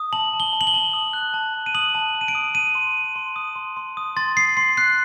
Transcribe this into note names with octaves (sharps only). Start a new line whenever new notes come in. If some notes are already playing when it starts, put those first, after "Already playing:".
Already playing: D#6
A5 F#7
A5
G7
A5
F#7
G7
A5
D#6
F#6
A5
A5
D#7
D#6 F#7
A5
A5
D#7
D7
D#6
D#6 D#7
C6
C6
C6
D#6
C6
C6
D#6
C6 A6
D#6 C7
C6 C7
F#6 C7